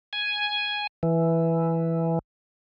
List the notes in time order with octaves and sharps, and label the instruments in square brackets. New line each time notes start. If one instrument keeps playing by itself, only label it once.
[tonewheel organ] G#5
E3